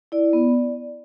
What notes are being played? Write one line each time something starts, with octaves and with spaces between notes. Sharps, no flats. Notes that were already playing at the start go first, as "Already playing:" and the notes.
E4 D5
B3